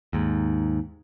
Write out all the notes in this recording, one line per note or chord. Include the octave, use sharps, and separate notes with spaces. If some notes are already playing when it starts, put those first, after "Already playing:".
D#2 G#2